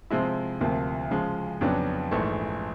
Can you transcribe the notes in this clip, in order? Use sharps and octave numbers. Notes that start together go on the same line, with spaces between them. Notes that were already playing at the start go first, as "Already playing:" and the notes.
C3 F3 G#3 C4 E4
D2 C3 F3 A#3
C#3 F3 G#3
F2 C#3 F#3 B3 D4
A#1 G#2 E3 A3